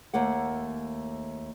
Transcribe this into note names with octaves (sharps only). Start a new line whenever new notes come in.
D#2 A3 A#3 F#5